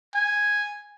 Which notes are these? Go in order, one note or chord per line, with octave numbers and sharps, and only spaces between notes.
G#5